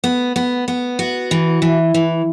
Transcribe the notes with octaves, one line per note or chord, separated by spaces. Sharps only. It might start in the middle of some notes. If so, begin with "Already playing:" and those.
B3
B3
B3
F#4
E3
E3
E3